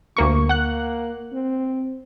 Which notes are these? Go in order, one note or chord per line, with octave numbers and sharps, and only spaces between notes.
D2 G2 A#3 C#6
A#3 F#5 F#6
C4